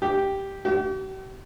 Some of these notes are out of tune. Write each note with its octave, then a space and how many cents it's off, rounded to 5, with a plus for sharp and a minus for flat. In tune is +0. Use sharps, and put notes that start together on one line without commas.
G4 -5
G4 -45